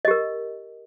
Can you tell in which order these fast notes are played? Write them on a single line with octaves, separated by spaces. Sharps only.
D#5 G4 A#4